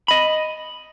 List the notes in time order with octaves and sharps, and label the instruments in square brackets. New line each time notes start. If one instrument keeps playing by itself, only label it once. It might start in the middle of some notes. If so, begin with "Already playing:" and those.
[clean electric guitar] D#5 B5